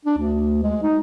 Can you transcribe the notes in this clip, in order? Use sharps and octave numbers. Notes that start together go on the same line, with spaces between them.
D4
D2
G#3
D#4